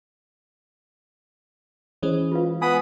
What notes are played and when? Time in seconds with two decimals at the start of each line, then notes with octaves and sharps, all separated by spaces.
2.03 E3 G#3 C#4 C5
2.32 F4 B4 F5
2.62 B3 G#5 B5 D#6